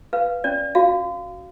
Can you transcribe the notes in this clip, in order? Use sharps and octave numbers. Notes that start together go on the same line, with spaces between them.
B4 F5
C#4 D5
F#4 F5